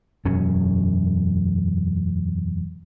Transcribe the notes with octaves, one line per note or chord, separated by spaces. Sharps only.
E1 F#2 C#4